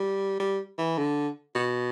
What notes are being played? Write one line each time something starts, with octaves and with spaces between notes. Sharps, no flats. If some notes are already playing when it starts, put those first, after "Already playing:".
Already playing: G3
G3
E3
D3
B2